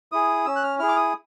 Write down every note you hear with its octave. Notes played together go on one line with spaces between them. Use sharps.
E4 G#4 D#6
C#4 E6
F#6
F6
E4 G#4 F6
D6
D#6